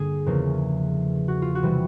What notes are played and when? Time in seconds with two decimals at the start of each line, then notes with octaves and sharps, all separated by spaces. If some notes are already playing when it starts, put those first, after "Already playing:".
Already playing: G2 D3 G3 A#3 G#4
0.26 E2 C#3 F3 A#3 C#4
1.28 F#4
1.42 F4
1.55 F#4
1.63 C3 E3 G3